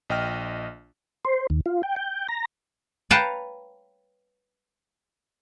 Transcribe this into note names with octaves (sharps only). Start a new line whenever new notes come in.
A#1 D#5 G5 F6
C5
D#2
F4
G5
G5
A#5
B4 C#5 F5 G5 A5 A#5